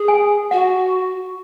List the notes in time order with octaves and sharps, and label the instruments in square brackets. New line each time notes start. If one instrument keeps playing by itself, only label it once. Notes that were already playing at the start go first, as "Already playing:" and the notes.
Already playing: [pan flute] G#4
[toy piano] G#5
[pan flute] F#4 [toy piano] F#5